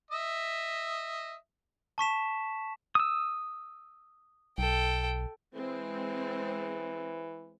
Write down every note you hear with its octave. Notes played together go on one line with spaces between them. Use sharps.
D#5 E5
A5 C#6 B6 E7
D#6 E6
B1 A4 G5
E3 G#3 C4